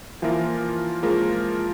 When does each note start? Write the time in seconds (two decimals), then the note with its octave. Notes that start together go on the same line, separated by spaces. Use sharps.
0.22 E3 F3 A#3 F4 A#4
1.03 F3 G#3 A#3 F4 A#4